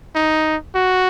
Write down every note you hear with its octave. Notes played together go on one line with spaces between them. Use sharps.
D#4
F#4